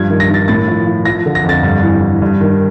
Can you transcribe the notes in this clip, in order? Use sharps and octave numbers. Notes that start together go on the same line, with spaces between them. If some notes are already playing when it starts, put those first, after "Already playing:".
Already playing: G2 F3 G#6
D#3
A#6
D#3
A6
A2 A6
F3
F3
F3 A#6
D3
A#6
F2 A6
G2
E3
E3
G2
D#3